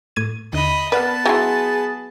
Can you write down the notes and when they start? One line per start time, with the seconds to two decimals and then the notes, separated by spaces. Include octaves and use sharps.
0.16 A2 G#6 D#7
0.53 D#2 D3 D#5 B5
0.92 B3 B4 D5 F#5 A5 F6
1.26 F#3 E4 G#4 G5 G#5 C6